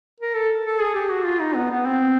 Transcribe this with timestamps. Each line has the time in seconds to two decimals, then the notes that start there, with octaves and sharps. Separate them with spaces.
0.20 A#4
0.35 A4
0.66 A4
0.80 G#4
0.95 G4
1.10 F#4
1.26 F4
1.40 D#4
1.55 B3
1.71 B3
1.86 C4